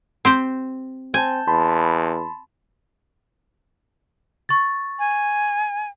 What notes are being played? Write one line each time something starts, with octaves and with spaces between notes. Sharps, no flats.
C4 G4 C5
C4 G#5 A5 G6
E2 A5 B5 C6
C#6 A6
G#5